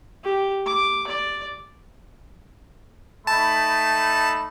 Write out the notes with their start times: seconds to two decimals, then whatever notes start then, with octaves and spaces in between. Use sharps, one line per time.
0.24 G4
0.66 D6
1.08 D5
3.27 A3 D#4 A5 B5